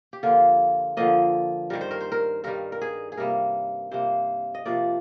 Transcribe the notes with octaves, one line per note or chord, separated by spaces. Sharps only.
G4
D3 F3 A#3 F4
D3 F3 A#3 D#5
G2 D#3 G3 A#4
C5
A#4
C5
A#4
G2 D#3 G3 A#4
A#4
G#4
G#4
C3 G3 A#3 A#4
C3 G3 A#3 C5
D#5
C3 F3 A#3 D5